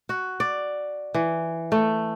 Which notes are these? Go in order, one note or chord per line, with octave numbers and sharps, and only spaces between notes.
F#4
D5
E3
A3